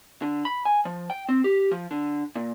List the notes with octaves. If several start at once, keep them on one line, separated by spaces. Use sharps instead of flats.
D3
B5
G#5
F3
G5
C4
G4
F3
D3
A#2